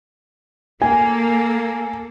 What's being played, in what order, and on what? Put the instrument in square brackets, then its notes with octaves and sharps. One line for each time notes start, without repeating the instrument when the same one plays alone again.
[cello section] A#3 A4 [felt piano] G#5